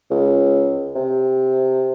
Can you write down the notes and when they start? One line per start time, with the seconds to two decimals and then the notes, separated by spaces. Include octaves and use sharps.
0.11 C#2
0.95 C3